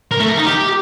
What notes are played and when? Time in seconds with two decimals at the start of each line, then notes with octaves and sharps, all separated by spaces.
0.11 A#4
0.20 A3
0.29 A#4
0.38 D#4
0.46 G4